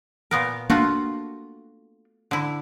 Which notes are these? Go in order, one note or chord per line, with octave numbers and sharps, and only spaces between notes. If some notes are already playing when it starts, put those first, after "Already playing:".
A#2 B3 A#4
A3 A#3 D4 F4 F#4
D3 E4